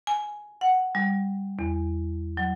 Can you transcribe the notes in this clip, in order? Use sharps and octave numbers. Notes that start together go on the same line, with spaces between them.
G#5
F#5
G3
E2
F#3